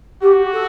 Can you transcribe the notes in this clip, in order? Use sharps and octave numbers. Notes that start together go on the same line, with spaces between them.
F#4 G4
A4